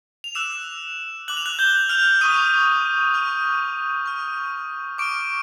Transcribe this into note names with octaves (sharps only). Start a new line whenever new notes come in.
F7
D6 E6 F#6 E7
D6 F#6 F#7
F7
F#6 F#7
G6 G7
F6 F7
C#6 D#6 F6 D#7
C#6 F6
C#6 F6
C#6 D6 F6 D7